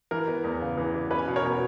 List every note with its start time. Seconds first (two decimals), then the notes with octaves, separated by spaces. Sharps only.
0.11 E3 A#4
0.28 B3
0.44 E2
0.61 C#3
0.78 E3
0.94 B3
1.11 C#4 B4
1.28 B2
1.36 A#4 C#5
1.45 B2